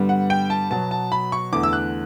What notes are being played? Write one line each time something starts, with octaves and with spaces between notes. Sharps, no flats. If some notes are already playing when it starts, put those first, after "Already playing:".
Already playing: G2 D3 G3 B3
F#5
G5
A5
B2 F#3 B3 A5
A5
B5
C#6
E2 D3 A3 D6
E6
F#6